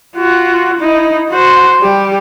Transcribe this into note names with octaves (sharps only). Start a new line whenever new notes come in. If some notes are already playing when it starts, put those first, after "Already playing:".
F4 F#4
D#4 E4
F#4 C5
G3 G4